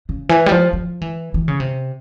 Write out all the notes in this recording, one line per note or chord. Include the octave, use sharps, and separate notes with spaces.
C#3
E3
G3
F3
F3
E3
E3
C#3
C3